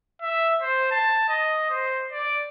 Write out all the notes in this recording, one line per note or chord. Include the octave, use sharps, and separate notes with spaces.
E5
C5
A5
D#5
C5
D5